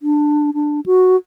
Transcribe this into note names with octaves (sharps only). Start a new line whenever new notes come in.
D4
D4
F#4